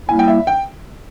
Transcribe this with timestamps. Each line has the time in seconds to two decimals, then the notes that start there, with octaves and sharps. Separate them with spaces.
0.09 G3 A#3 E4 G#5
0.19 G5
0.28 E5
0.47 G5